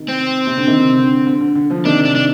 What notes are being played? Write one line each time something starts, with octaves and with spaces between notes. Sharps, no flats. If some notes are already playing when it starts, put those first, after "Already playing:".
Already playing: C3 D#3
C4
C3
D3
C3 D#3
D3
D3
D3
D3
D3 F3
C3 D#3 D4
D4
D4